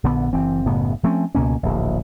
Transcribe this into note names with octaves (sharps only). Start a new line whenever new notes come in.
A#1 D3 B3
F#1 E3 C4
F#1 A2 C#3 B3
F3 A3 C4 C#4
C#2 B2 A#3 C#4
D1 A#1